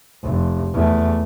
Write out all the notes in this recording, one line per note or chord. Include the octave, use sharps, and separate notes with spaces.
F1
E2 A3